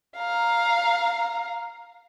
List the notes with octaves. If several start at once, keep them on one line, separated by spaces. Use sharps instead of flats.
F5 A#5